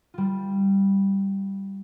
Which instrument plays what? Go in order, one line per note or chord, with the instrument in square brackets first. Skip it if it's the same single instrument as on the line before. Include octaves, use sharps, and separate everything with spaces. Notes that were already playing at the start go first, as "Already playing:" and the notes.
[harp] G3 F4